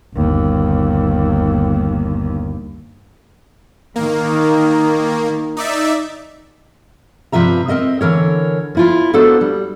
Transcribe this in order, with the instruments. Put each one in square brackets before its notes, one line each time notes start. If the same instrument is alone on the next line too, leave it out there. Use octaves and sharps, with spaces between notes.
[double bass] G1 D#2
[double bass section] D#3 [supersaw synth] A#3
[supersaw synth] D#4 D5 E5
[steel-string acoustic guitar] G2 C3 F3 B4 E5 A#5
C4 A#4 D#5 E5
D3 E3 A#4 C#5
F3 E4 F4
A#3 B3 D4 F#4 A4 C5
G3